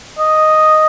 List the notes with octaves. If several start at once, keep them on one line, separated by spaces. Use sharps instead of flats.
D#5